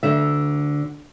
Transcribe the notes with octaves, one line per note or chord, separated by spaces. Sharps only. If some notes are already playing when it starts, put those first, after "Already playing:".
D2 D3 E5